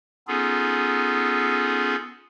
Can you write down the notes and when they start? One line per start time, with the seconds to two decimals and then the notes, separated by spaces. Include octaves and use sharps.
0.28 B3 C#4 D#4 F4 G#4 A4